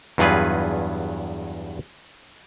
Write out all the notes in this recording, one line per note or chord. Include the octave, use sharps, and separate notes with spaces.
E2 G2 F#3 F4 G#4 B4